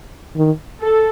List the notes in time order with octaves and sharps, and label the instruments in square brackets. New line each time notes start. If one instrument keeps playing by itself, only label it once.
[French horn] D#3
[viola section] A4